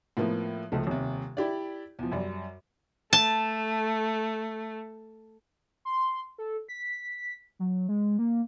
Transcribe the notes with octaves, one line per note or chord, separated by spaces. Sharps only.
A2 F3 A#3 B3
C#2 F3 A3
D#1 C3
E4 G4 D5
E2 F3
F#2 G3
A3 A5
C6
A4
B6
F#3
G#3
A#3